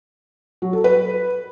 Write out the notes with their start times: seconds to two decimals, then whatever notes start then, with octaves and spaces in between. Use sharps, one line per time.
0.62 F#3
0.73 A4
0.84 B4